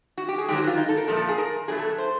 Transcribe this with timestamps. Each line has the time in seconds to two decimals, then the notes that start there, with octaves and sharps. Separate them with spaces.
0.18 F#4
0.29 G4
0.38 G#4
0.48 G#2 D#3 F#3 G4
0.58 F#4
0.67 F4
0.77 D#4
0.89 A4
0.97 A#4
1.08 A#2 F3 A3 A4
1.18 A4
1.29 G#4
1.38 A#4
1.68 B2 F#3 A3 G#4
1.79 A4
1.98 C5